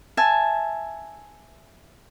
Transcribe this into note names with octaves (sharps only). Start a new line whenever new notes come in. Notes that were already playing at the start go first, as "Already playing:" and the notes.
E5 G#5 A5